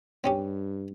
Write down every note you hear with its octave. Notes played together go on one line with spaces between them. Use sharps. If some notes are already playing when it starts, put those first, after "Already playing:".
G2 C4 C#4 G4